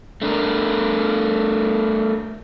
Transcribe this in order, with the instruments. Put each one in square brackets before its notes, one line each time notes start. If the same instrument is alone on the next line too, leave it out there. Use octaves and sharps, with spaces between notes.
[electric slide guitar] A3 D4 A#4